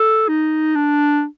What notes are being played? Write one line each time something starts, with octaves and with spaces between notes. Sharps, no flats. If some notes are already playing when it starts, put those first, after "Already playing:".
Already playing: A4
D#4
D4